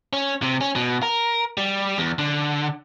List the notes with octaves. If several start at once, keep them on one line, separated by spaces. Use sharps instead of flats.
C#4
C3
C#4
B2
A#4
G3
E2
D3